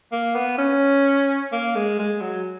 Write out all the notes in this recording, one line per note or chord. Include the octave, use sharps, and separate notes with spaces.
A#3
B3
C#4
A#3
G#3
G#3
F#3